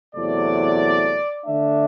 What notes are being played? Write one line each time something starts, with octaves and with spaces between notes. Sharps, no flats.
E2 C3 F#3 A3 D5
D3 A3 D4 E5